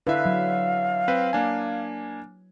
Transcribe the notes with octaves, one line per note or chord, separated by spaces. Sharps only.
D3 E4 B4 E5 F5
F#3
C4 B4
A#3 D4 G#5